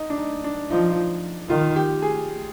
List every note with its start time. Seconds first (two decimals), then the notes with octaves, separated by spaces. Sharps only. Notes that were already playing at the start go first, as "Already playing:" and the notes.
Already playing: D#4
0.10 D4
0.18 D#4
0.44 D4
0.70 F3 D#4
1.49 D#3 F4
1.76 G4
2.02 G#4